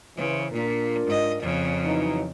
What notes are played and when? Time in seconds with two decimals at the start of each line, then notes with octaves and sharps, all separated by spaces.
0.17 C#3 E3 C5
0.52 A#2 D4 F4 A#4
1.07 G#2 D#5
1.41 F2 C#3
1.84 E3 F#3 D#4